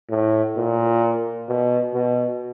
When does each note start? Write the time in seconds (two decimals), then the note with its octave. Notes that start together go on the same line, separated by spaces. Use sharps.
0.10 A2
0.57 A#2
1.49 B2
1.94 B2